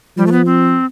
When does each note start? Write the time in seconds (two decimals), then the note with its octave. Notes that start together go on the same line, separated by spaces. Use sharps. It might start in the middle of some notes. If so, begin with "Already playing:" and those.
0.17 F3 G3
0.27 A3
0.32 B3
0.46 C4